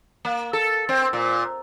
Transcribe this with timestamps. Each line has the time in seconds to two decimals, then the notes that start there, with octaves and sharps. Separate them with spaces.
0.25 A#3
0.53 A4
0.89 C4
1.13 A#2